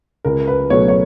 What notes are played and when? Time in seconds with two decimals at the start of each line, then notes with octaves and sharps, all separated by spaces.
0.25 C#2 A#4
0.48 B4
0.70 B2 F#3 A3 C#5
0.88 C#5